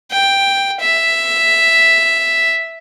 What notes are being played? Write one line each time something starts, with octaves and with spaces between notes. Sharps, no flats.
G5
E5